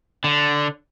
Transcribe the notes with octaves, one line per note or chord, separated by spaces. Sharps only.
D3